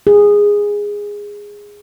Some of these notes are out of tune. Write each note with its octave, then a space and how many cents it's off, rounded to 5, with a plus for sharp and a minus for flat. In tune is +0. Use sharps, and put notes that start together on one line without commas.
G#4 -10